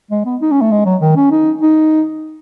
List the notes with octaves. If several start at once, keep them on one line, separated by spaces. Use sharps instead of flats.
G#3
B3
D#4
C#4
A3
G#3
F#3
D#3
C#4
D#4
D#4